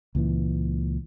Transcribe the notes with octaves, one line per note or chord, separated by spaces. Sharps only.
C#2 A#2 E3